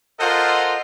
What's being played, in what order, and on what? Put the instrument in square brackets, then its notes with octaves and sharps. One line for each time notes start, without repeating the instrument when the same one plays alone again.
[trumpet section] F4 A4 A#4 C5 D#5 F#5